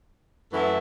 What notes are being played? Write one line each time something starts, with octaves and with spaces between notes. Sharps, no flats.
F#2 E3 A3 E4